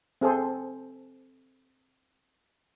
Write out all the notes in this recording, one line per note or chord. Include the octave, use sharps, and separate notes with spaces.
C4 G#4 A4 C5